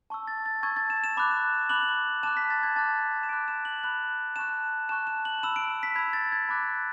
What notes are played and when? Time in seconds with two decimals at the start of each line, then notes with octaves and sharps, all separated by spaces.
0.10 A5 C#6 E6
0.28 A6
0.46 A6
0.63 A5 C#6 E6 G#6
0.77 A6
0.90 E7
1.04 E7
1.17 B5 D6 F#6
1.69 B5 D6 F#6 F#7
2.23 A5 D6 F#6 E7
2.37 B6
2.50 A6
2.63 G#6
2.76 A5 D6 F#6 A6
3.23 E7
3.29 B5 D6 F#6 D7
3.48 E7
3.65 F#7
3.83 B5 D6 F#6
4.36 A5 C#6 F#6 E7
4.89 A5 C#6 F#6 E7
5.07 E7
5.25 F#7
5.43 B5 E6 E7
5.56 D7
5.83 B6
5.96 B5 E6 G#6
6.13 A6
6.32 G#6
6.49 B5 D6 F#6